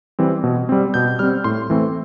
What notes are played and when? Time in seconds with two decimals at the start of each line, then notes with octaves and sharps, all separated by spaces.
0.19 E3 G3 C4
0.44 B2
0.69 G3 C4
0.94 B2 G6
1.19 G3 C4 F6
1.44 A2 C6
1.70 E3 A3 C4